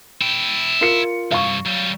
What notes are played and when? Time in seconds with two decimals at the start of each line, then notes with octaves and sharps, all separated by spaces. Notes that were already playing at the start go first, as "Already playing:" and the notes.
0.21 E4 G5
0.81 F4 A#4 C#7
1.31 C2 G2 F5 C#6
1.65 F#3 G3